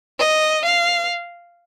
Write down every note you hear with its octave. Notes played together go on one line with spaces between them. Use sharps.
D#5
F5